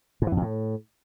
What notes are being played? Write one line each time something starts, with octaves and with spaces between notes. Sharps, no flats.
G#2
E3
F#2
F2
A2